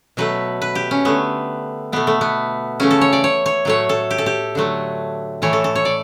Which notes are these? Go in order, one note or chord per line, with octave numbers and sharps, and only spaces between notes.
B2 F#3 A3 B4
B4
G4
C#4
D3 A3 B3
B2 A3 B3
A3
B3
C#3 E3 A3 C#4
A4
C#5
D5
C#5
C#5
A2 F#3 A3 C#5
A4
G4
A4
G4
D3 F#3 A3
A2 E3 A3 C#5
A4
A4
C#5
D5